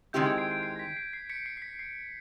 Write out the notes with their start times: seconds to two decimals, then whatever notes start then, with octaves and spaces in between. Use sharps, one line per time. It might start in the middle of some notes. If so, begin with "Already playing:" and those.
0.13 D#3 G#3 C4 E4 G4 G6
0.26 G#6
0.38 C7 D7
0.51 C7 D7
0.63 C7
0.76 A#6
0.79 B6
0.97 C7
1.13 C7
1.30 B6 C#7
1.46 C7
1.57 C7
1.62 B6
1.79 C7